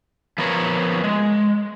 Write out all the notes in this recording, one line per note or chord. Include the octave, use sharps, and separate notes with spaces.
F3 B3 A#4 C#5
G#3